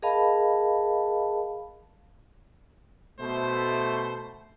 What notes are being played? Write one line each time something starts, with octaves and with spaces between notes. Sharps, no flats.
G#4 A#4 D#5 F5 A5 B5
B2 A3 C5